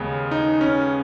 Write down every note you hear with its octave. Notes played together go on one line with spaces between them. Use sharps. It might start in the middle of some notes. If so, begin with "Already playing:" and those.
Already playing: D#2 C#3 G#3 B3
D#4
C#4